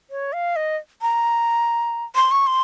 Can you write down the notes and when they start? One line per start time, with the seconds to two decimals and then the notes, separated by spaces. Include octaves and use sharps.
0.10 C#5
0.33 F5
0.56 D#5
1.02 A#5
2.16 C6
2.31 C#6
2.47 C6